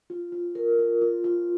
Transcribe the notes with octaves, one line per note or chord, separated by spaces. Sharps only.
F4
F4
A#4
F4
F4
F4